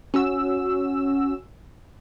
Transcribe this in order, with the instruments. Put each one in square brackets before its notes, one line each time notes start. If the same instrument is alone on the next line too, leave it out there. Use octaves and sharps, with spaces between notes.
[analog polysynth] C#4 F#4 E6